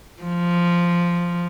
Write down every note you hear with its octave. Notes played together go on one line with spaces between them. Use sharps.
F3